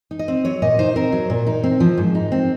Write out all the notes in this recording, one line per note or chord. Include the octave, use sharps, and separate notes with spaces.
D#4
D#5
C4
F#3 C#5
A#2 D#5
D#4 C5
C4 A#4
F#3
A#2
D#4
C4
F3
G#2
D#4
C4